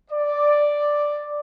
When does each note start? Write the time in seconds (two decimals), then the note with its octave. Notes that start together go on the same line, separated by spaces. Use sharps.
0.11 D5